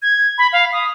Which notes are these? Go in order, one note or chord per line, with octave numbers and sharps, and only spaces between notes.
G#6
B5
F5
D#6